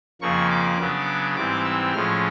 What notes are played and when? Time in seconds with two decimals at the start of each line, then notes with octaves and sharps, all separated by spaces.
0.21 F2 C#3 F3 A#3 C#6
0.50 D6
0.79 C#3 F#3 B3 D4
1.36 G#2 E3 G3 C4 D6
1.65 E6
1.93 A2 F3 G#3 C#4 F6